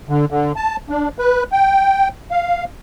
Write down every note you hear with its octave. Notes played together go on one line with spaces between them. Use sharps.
D3
D3
A5
D4
B4
G5
F5